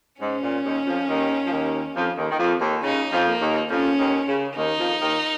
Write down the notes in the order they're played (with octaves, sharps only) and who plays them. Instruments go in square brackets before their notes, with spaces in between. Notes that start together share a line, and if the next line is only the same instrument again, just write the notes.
[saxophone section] G#2 [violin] C#4
[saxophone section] A#2
D#2 D#3
F2 F3
D#2 D#3
F3
D#2 D#3
F2 F3
D#2 D#3
D#3
F2 F3
D#2 D#3
[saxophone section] C#3 [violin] D#4
[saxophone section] F2 F3
[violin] A#3
[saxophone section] D#2 D#3
[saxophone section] F2 F3 [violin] C#4
[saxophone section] D#2 D#3
C#3
[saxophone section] D#2 D#3 [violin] D#4
[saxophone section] F2 F3
D#2 D#3